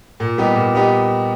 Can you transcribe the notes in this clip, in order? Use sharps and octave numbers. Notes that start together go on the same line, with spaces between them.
A#2
G3 B3 D#4 G4
A#2
G3 B3 D#4 G4